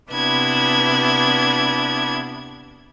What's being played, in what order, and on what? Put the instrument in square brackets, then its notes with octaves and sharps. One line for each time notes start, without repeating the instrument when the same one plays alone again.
[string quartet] C3 B3 D4 E4 G#6